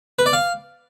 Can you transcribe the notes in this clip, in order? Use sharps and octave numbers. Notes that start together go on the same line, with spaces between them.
B4
D5
F5